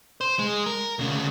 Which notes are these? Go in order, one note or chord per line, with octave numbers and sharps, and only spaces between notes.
C5
G#3
A#4
D2 C#3